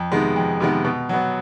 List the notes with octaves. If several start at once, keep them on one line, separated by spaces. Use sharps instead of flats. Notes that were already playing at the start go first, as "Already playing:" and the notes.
Already playing: F2
C3 D#3 G#3 B3
F2
C3 D#3 G#3 B3
B2
F#3 B3